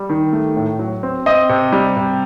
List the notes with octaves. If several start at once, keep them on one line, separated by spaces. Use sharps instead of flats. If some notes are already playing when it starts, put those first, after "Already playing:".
Already playing: G3
D#3
A3
A2
F#3
C4
C4 D#5
C3
G3
C3